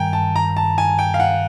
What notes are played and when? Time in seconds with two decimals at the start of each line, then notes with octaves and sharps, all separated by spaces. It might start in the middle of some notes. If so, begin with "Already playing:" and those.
Already playing: G2 D#3 G5 G#5 A#5
0.13 A5
0.36 A#5
0.57 A5
0.78 G#5
0.99 G5
1.14 F5
1.20 F#5